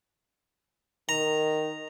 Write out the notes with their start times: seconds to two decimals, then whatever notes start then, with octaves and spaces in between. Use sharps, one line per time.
1.09 D#3 A#5